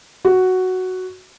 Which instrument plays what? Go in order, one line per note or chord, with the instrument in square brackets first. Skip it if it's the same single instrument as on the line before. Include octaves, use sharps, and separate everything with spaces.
[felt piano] F#4